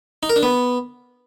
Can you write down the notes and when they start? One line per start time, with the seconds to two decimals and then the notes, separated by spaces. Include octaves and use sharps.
0.23 D#4
0.29 A#4
0.36 D4
0.43 B3